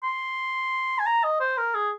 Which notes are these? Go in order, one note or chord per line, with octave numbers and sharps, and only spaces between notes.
C6
G#5
A#5
D#5
C5
A#4
G#4